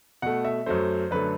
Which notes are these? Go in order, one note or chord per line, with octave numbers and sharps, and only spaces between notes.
B2 A3 F#5
E5
F#2 F#3 A3 C5
F#2 D3 A3 B4